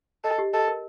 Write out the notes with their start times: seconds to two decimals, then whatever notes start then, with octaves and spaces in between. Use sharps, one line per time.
0.24 A4 D#5
0.38 G4
0.53 A4 D#5
0.68 A#4